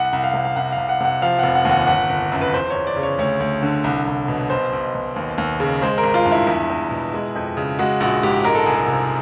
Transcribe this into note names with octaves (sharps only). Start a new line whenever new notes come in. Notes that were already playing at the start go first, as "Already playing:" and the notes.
Already playing: C2 F#5
C2
F5
C3
F5
C2 F#5
F5
C2
F#5
C3 F#5
F3 F5
F1 F#5
F#5
D#2
F#5
G1 F#5
G1
F#2
B4
E2 C5
E2 C#5
D5
C#3
C#5
D2 C#5
D2
D3
C2
C2
B2
B1 C5
B1
B2
D#2
D#2
C#3
G#3 C5
A#4
G#1
F4
G2
E4
E2
E2
B2
G#3
F2
C#3
G#3 F#4
A#1 F#4
G#2 G4
G#3 A#4
A4
C2 G#4
A4
C3